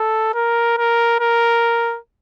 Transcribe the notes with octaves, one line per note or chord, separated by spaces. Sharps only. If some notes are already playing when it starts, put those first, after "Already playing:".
Already playing: A4
A#4
A#4
A#4